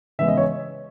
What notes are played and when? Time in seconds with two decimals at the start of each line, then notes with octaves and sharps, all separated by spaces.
0.19 C#3 E3 G#3 B3 E5
0.28 D#5
0.37 C#5